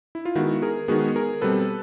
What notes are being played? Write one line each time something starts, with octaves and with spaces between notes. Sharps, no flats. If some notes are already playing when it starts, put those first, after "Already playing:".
E4
F4
D#3 G#3 B3 E4 F#4
G#4 A#4
D#3 G#3 B3 F#4 G#4
G#4 A#4
B2 G3 C4 A4 B4